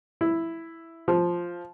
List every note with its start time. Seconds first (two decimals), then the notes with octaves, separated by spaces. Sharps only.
0.21 E4
1.08 F3